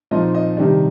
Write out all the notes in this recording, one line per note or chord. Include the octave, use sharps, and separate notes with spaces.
A#2 F3 C4 D#4 D#5
D#5
C3 D#3 G3 D4